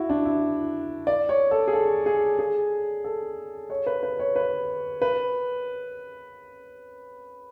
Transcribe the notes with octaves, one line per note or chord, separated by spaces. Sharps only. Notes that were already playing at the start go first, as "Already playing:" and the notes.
Already playing: E4 F#4
D4
E4
D5
C#5
A4
G#4
A4
G#4
G#4
A4
C#5
B4
B4
C#5
B4
B4